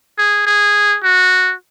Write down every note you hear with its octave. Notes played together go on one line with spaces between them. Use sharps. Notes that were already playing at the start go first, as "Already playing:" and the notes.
G#4
G#4
F#4